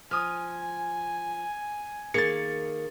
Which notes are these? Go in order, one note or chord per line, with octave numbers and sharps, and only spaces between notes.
F3 G#5 D#6 F6
D#3 A#3 G#4 A6 C#7